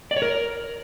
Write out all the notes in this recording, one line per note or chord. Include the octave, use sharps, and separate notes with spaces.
D5
C#5
A#4